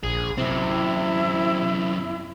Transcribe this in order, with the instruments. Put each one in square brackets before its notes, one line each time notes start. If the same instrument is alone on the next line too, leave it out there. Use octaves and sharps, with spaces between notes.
[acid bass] A#1 [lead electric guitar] G#4
[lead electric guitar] F#2 C4 [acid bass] C3 [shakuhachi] E4